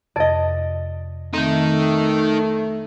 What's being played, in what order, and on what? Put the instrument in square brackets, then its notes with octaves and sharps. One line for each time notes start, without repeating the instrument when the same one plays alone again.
[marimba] F2 C3 [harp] D5 D#5
[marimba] D#3 C4 [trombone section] A3 [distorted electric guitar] D#4 A#4